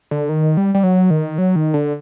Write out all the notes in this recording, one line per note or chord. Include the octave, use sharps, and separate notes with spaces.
D3
D#3
G3
G3
F#3
D#3
F#3
D#3
D3